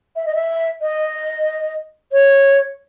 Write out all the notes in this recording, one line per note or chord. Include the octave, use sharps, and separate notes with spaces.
E5
D#5
E5
D#5
C#5